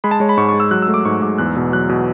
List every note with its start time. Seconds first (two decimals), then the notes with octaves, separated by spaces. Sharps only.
0.04 G#3 B5
0.11 A5
0.20 G#3 C#5
0.29 B5
0.37 G#2 C#6
0.49 C#6
0.54 G#3
0.60 E6
0.71 F#3 F#6
0.82 E6
0.88 A3
0.94 D6
1.05 G#2 C#6
1.22 G#2 D6
1.38 E2 F#6
1.56 B2
1.72 F#3 F#6
1.89 B2